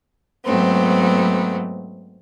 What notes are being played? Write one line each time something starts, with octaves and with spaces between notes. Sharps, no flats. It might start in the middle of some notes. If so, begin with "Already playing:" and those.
G#2 F#3 A3 B3 C4